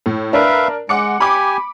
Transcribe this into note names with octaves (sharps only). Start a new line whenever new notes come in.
A2
D4 A#4 B4 E5 F5
G#3 F#5 D6 C#7
G4 G#5 B5 D6